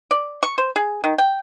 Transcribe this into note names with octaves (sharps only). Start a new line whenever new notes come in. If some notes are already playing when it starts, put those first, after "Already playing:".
D5
C#6
C5
G#4
D#3
G5